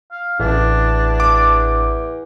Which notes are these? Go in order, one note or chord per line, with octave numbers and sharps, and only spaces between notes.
F5
A1 E2 D4
D6